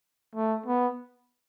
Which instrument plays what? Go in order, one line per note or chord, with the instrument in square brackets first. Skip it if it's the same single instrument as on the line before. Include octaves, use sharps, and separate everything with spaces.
[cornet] A3
B3